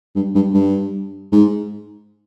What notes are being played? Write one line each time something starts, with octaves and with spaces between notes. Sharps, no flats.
G2
G2
G2
G#2